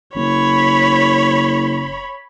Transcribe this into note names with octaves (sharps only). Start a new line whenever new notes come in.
F#1 C#5 B5